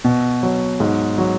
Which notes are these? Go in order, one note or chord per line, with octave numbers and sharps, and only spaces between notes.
B2
F#3
G#2
F#3